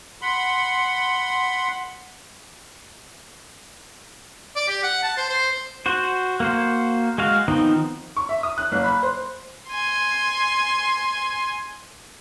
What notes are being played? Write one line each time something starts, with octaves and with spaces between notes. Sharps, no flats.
F#5 B5 C6
D5
G4
F#5
A5
C5
C5
F#4 C5
A#3 F#4 C5
G#3 F#4 F5
D#3 F3 B3 C4 D#4
C#6
E5
D#6
F#6
F#1
B5
C5
G#5 C6